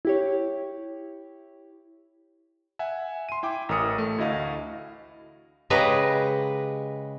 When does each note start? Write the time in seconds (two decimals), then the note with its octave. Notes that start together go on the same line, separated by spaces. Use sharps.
0.05 E4 G4 C#5
2.79 E5 F#5 G#5
3.29 C6 D#7
3.43 E4 G5 D6
3.69 A1 A#4 D#6 C#7
3.98 A3
4.18 D2 E4 F#4 D#5 F5
5.70 C#3 G#3 G4 B4 D#5 A#5